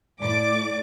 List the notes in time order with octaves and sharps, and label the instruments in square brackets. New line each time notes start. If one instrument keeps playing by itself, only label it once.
[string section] A2 D6 [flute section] D5